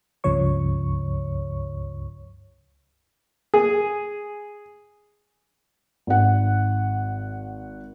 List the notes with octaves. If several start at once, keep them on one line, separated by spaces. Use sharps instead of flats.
C#2 G2 C#3 F3 C#5 C#6
G#4
G#1 F#5